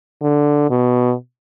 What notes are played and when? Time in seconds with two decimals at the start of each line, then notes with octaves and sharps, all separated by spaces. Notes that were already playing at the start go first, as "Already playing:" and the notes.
0.22 D3
0.70 B2